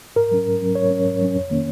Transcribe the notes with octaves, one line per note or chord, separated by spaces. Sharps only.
G#2 A#4
F#3 C#4
G#2
F#3 C#4
G#2 C#5
F#3 C#4
G#2
F#3 C#4
F2
D#3 A#3 C#4